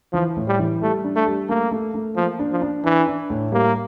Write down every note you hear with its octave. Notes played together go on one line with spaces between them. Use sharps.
E3 F3
A2
G3
E3
G3 A3
D4
A3
G3
A3 A#3
A3
A3
F3 A#3
D4
F3
D4
E3 D4
D4
A2
G3 A#3